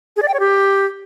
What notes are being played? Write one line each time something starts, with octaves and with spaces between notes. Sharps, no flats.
G#4
D5
G5
C#5
G4